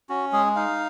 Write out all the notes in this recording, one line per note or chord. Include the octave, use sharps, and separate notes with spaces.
C#4 F#4
G#3 G#4
D#4 F5